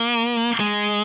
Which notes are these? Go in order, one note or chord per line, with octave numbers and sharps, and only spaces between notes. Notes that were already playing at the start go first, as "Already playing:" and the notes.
Already playing: A#3
G#3